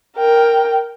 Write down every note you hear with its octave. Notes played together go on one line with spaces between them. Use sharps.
A#4 G5